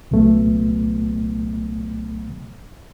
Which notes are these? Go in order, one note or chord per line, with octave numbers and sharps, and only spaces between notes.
C2 A#2 F#3 A3 B3